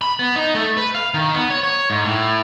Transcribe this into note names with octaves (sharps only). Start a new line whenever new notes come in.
B5
B3
D#4
A3
B4
F5
D#3
B3
C#5
C#5
G#2
A2